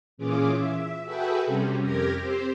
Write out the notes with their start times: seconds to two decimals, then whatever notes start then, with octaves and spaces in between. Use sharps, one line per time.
0.18 A#2 E3 C#4 F4 G#4 D6
0.54 E5
1.04 F#4 G#4 A4 B4 E5 G5
1.46 C3 G3 C#4
1.81 F2 G4 A#4 G#6 A#6
2.19 C4 G4 C5